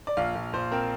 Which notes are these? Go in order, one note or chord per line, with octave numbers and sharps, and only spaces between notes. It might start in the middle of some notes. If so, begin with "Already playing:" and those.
D5
A#1 F5
A#1
A#1 C5
C4 A#4